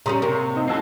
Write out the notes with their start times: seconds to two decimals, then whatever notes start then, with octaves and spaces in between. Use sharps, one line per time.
0.06 C#3 G3 C#4 A#5 C6 C#6
0.22 C3 A#3
0.56 C4 D#4 D#5
0.68 A2 F#3 C#4 A5 E6 C7